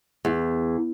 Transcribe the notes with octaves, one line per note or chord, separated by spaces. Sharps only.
E2